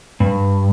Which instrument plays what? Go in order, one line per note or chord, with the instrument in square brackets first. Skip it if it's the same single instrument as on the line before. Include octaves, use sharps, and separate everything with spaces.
[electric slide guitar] G2